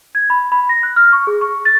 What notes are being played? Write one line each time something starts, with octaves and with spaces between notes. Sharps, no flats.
G#6
B5
B5
A#6
F#6
F6
C#6
G#4
C#6
A6